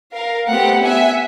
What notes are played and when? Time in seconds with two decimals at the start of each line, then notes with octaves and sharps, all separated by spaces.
0.12 A#4 F5
0.49 A3 B3 C4 G4 F#5
0.83 E5 F#5 G#5